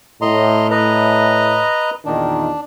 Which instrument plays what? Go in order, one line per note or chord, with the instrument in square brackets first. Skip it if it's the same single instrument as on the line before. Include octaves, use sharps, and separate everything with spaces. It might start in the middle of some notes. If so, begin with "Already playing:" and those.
[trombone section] A2 [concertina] D#5 A#5 C6
[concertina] B4 D#5 A#5
[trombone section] E2 A#2 D#3 [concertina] D4